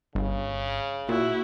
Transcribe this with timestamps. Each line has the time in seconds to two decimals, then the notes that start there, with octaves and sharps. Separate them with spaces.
0.15 G1 C#3
1.09 A#2 E4 F#4